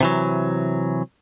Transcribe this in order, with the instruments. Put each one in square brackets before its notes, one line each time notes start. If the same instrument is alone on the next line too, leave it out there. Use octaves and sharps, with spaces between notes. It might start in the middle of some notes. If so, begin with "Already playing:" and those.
[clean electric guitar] C3 E3 F#3